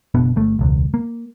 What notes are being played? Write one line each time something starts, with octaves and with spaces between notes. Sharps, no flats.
F#1 B2 B3 D4
G1 A3
E1 C#2
A#3